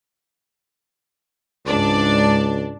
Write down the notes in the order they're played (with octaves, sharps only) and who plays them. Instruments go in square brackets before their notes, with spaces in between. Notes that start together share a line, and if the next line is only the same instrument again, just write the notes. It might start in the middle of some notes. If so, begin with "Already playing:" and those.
[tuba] C#2 [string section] G#2 D4 D5